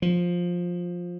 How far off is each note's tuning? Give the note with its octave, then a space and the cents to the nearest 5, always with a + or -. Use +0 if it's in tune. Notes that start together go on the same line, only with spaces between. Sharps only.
F3 +10